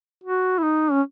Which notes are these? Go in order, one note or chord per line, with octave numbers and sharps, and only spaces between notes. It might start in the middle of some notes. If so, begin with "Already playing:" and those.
F#4
E4
D#4
C#4